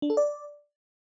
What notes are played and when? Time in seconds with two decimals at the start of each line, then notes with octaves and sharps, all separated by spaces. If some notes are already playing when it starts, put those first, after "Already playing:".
0.02 D4
0.10 A4
0.17 D5